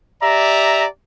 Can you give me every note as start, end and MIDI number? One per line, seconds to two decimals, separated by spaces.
0.23 0.86 67
0.23 0.86 74
0.23 0.86 76
0.23 0.86 82